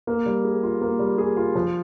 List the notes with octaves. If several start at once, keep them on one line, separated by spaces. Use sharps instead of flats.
A#3
G3
G#4
F4
A#3
G3
G#4
F4
F3